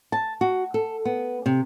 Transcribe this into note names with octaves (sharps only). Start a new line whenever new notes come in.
A5
F#4
A4
B3
C3